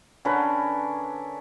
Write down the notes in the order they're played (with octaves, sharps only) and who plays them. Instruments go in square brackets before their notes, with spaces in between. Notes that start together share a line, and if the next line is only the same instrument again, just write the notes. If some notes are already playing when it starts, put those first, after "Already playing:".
[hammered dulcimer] D3 C#4 A#4 B4